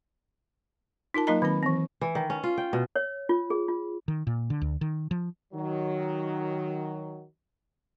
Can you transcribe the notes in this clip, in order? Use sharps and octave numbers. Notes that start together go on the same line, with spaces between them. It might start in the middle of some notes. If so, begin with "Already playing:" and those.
D#4 F4 A#4 A5
F#3 A#3 D#4 A#4 D#5 A#5
D#3 F#3 C4 B5
E3 C4
E3
D#3
C#4
F4
G5
B2
C#5
F4
G#4
F4
D#3
A#2
D3
D2
D#3
F3
D#3 F#3